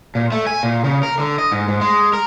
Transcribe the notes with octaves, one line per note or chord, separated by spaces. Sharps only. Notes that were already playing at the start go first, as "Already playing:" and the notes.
A#2
A3
G#5
A#2
C#3
A#4
D3
D#5
G#2
G#2
G#3
A#4